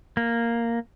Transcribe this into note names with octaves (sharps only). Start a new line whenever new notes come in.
A#3